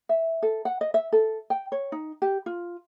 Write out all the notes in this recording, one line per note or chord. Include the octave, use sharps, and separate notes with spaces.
E5
A4
F#5
D#5
E5
A4
G5
C#5
D#4
G4
F4